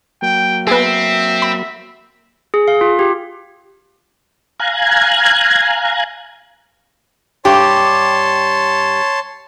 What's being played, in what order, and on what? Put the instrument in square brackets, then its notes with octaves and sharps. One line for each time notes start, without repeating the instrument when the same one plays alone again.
[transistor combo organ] F#3 A#3 [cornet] G5
[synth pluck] B3 G#4 [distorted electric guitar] C4 [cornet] E5
[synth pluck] B5
[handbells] G#4
F5
F4
G4
[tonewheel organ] F5 G#5 A#5 F#6 G#6
[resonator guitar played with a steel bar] G2 G4 [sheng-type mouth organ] C#5 A5 C6